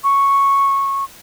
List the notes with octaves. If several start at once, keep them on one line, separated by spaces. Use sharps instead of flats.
C#6